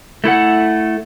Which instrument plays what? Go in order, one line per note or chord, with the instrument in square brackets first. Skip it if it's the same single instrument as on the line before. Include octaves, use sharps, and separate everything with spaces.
[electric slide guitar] A3 E4 A4 F#5